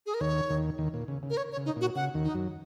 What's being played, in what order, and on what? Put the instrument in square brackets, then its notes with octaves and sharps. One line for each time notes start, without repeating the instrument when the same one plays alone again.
[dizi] G#4
A#4
[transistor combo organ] D#2 D#3 [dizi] C#5
[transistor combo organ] D#2 D#3
D#2 D#3
A#2
C#3
C#3
[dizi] A#4
C#5
C#5
[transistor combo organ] C#3
[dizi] D#4
[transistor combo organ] A#2 [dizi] F#4
[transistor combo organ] C#3 [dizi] F#5
[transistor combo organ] D#2 D#3
[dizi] D#4
[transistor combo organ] F#2 F#3